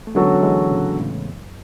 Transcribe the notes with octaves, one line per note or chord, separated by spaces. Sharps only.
A3
D3 F#3 G#3 B3 C#4 F#4 A4
E3 G#3
A2 C#3
A2 C#3
F#2